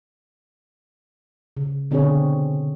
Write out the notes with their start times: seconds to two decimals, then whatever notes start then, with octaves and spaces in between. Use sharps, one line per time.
1.57 C#3
1.91 B2 D3 C4 C#4 G#4 C#5